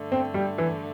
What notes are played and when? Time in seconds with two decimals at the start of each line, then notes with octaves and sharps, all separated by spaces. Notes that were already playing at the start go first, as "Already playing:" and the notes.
Already playing: G2 D3 A3
0.12 C4
0.34 G3
0.58 E3